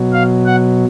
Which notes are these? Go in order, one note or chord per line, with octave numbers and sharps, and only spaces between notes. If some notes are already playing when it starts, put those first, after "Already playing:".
Already playing: B2 F#3
F5
F#5